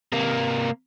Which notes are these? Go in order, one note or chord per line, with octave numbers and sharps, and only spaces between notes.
C3 A#3